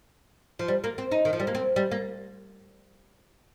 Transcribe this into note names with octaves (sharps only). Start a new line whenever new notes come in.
F3
G3
A#3
C4
D#4
D#3
F3
G3
A#3
C4
G3
A#3